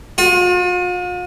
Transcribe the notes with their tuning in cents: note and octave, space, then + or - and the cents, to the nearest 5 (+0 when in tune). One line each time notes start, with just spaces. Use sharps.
F4 +45